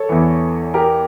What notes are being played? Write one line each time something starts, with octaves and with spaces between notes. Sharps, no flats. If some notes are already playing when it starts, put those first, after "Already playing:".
Already playing: A4 C#5
E2 E3
G4 A#4